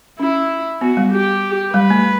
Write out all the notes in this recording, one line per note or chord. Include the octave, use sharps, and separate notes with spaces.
C#4 E4
B3 F#4
G3
G4
G3 B4
A3